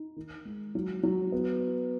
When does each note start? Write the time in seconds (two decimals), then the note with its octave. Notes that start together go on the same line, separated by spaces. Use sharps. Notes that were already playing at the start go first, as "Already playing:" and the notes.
Already playing: D#4
0.16 D#3
0.45 G#3
0.75 F#3
1.03 F#3
1.32 B3